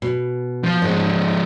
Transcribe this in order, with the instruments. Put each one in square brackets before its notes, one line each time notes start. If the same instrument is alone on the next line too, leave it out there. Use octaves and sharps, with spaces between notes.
[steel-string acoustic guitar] B2
[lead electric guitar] F3
[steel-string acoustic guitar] G#2 A4 [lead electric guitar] F3 G#3